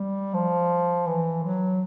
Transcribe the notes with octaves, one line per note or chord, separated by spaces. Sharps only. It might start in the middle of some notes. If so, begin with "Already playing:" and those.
Already playing: G3
F3
E3
F#3